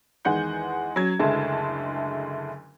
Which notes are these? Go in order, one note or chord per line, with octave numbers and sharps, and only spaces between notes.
E2 D#3 G#3 F#5 G#5 G6
F#3 C#4 G#6
F#1 D2 G#3 A3 E4 A5